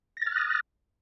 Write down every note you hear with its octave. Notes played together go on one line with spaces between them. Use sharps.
D#6 F6 F#6 A6 A#6